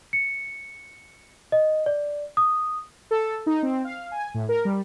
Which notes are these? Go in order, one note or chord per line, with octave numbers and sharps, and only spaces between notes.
C#7
D#5
D5
D#6
A4
D#4
C4
F5
G#5
A2
A#4
G3